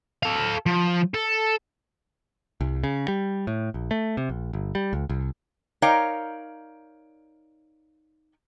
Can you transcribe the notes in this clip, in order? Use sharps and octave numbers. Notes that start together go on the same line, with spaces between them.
A4 F5
F3
A4
C2
C#3
G3
A2
A#1
A3
C3
A#1
G1
G3
C#2
C2
D#4 A#4 C#5 D5 F5 G5